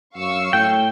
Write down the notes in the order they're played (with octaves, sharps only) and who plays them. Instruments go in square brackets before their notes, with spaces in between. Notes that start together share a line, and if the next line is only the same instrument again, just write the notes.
[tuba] F#2 [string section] F5 C#6 E6
[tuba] A2 [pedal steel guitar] G5